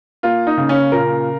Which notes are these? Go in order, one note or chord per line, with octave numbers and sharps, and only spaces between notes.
A#3 F4
D#4
C#3
C#4
A#2 A#4